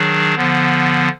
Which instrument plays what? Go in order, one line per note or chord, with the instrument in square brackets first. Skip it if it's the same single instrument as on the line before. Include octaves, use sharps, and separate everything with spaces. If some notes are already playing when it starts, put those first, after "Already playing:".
Already playing: [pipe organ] D#3 F#3 D4 G#4
D3 F3 B3